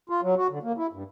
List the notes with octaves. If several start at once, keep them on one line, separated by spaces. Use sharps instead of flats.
F4
F#3
F#4
D3
A#3
E4
G2